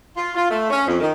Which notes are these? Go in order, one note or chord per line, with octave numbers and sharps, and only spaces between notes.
F4
F4
A3
C#4
F2
D#3